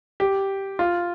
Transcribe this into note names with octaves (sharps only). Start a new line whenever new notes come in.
G4
F4